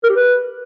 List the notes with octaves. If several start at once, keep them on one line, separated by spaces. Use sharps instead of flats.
A#4
G4
B4